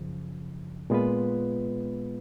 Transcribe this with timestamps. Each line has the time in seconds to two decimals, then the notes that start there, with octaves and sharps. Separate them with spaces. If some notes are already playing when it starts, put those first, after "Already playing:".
Already playing: F#2 C#3 F3
0.90 A#2 G#3 B3 F4 B4